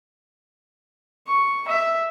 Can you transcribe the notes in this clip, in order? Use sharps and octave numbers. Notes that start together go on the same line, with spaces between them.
C#6
E5